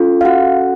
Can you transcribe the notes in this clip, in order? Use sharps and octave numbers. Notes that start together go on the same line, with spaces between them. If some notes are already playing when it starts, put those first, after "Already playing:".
Already playing: C#4 F4 A4
F5
F#4 F#5